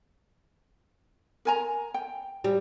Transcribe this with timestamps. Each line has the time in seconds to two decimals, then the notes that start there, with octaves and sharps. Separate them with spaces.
1.45 A#4 G#5 A#5
1.94 G5
2.44 G3